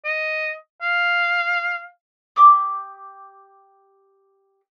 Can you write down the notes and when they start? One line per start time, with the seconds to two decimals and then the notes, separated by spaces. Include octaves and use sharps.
0.05 D#5
0.82 F5
2.36 G4 D6 D#6